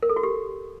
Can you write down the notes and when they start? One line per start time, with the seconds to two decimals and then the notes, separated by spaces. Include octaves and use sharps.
0.03 A#4
0.09 A4
0.16 F#4
0.23 G4